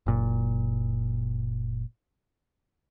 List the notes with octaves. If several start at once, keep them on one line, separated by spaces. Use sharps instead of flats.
F#1 A#2